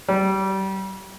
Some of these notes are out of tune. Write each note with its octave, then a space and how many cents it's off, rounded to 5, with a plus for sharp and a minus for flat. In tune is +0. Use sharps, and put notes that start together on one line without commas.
G3 -30